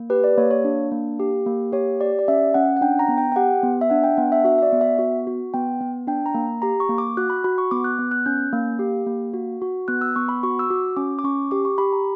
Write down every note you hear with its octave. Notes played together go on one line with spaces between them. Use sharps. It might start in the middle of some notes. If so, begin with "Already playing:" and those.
Already playing: A#3
G4 B4
D5
A#3 C#5
C#5
D4
A#3
G4
A#3
G4 C#5
G4 D5
D5
C#4 E5
C#4 F#5
F#5
D4 G5
A#5
B3
G5
G5
G4 F#5
B3
E5
D4 F#5
G5
B3 F#5
E5
F#4 E5
E5
D5
B3
E5
F#4
F#4
B3 G5
B3
D4 G5
A#5
A#3
G4 A#5
C#6
A#3
D6
F#4 F#6
B5
F#4 B5
C#6
B3 D6
F#6
B3
F#6
C#4 G6
A#3
G4
A#3
F#4
F#4
B3 F#6
E6
B3 C#6
B5
F#4 C#6
E6
F#4 D6
C#4 D6
D6
C#4 C#6
G4 D6
C#6
G4 B5
A#5